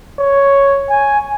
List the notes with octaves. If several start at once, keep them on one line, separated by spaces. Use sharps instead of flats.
C#5
G#5